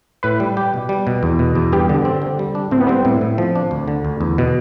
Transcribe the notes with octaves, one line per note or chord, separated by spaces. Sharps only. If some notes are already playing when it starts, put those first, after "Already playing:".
A2 B4
G3
G4
B2
G3
B2
E2
B2
E2
G2 G4
D3
C4
D3
G3
D4
A2 C4
B3
G3 C4
A2
A2
F3
D4
D2
D3
D2
E2
B2